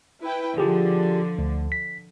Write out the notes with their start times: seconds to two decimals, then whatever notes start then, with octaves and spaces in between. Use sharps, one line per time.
0.22 E4 B4 G5
0.58 D3 F3 F4 G4 G#4
1.38 D2
1.72 B6